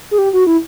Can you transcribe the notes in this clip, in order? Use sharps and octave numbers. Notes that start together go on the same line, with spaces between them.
G#4
G4
F#4
E4